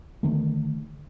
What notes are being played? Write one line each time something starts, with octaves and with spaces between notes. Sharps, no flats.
D3 D#3 A3